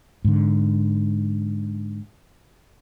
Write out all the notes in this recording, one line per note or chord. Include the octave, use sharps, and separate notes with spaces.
G#2 D3